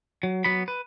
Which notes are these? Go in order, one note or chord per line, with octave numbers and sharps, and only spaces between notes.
F#3
F#3 B3 B5
B4